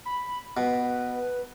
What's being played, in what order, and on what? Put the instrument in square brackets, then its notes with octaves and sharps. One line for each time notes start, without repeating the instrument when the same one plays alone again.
[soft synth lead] B5
[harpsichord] B2 [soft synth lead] B4